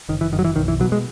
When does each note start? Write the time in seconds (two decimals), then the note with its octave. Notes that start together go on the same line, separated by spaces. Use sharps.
0.09 F#1 D#3
0.21 E3
0.32 F#2 D#3
0.39 F#3
0.45 E3
0.56 B1 D#3
0.68 E3
0.80 B2 F#3
0.92 G#3